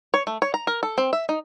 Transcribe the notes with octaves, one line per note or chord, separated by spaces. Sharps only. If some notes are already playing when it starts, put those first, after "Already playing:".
C#5
A3
C#5
A#5
A#4
A4
C4
E5
D#4